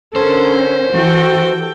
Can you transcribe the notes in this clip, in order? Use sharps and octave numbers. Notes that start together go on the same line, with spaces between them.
D3 C#4 A4 A#4 C5
E3 F#4 G4 A4 G5